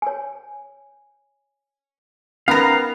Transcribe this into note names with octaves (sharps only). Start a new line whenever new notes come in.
C#5 G#5
B3 C#4 D#4 A#4 B4 F5 A#5